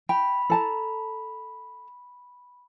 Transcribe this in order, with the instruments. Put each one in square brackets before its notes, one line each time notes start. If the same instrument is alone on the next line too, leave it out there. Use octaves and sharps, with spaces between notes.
[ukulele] G5 [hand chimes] B5
[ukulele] A4 A5 A#5